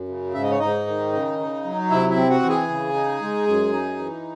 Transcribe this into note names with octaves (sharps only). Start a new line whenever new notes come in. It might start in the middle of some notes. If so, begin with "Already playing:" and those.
Already playing: F#2
C#3
G#2 E5
D#5
C#5
G#2 D#4 D#5
D#3
C#3
D#4
F#3
C3 E4 E5
E4 E5
C4
F#4 F#5
E3
G#4 G#5
C#3
D#4
G#3
F#2
D#4
E3